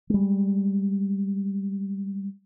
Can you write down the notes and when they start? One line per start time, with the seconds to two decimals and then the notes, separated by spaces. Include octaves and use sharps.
0.10 G3 G#3